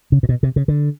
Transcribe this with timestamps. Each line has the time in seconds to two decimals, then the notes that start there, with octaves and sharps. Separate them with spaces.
0.12 C#3
0.23 A#2
0.29 B2
0.43 C3
0.56 C#3
0.68 D3